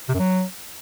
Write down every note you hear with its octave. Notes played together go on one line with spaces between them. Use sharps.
C3
F#2
F#3